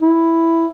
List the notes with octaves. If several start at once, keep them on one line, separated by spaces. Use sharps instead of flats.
E4